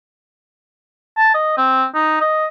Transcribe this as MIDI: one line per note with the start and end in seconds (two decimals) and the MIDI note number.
1.17 1.29 81
1.34 1.53 75
1.58 1.85 60
1.95 2.20 63
2.21 2.46 75